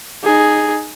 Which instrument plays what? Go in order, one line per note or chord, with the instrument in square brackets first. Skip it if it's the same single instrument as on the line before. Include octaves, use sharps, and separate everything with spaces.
[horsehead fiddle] D#4 G#4